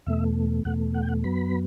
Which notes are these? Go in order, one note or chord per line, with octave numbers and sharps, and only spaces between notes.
E2 B2 A3 E5
E2 B2 A3 F#5
F#5
G5
F#5
F#2 F#3 B3 B5